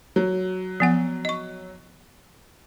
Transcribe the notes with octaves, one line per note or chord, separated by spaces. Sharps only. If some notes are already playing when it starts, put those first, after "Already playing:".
F#3
F3 B3 F#5
D#5 C#6